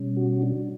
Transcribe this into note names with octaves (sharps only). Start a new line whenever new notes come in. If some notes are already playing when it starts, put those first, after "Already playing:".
Already playing: B2 G3 C#4
F#4
D4